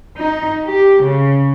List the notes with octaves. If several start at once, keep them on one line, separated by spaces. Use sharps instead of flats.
D#4
G4
C#3